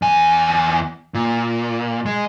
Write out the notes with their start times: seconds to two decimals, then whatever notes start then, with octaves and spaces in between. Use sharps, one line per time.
0.02 E2 G#5
1.14 A#2
2.06 G#3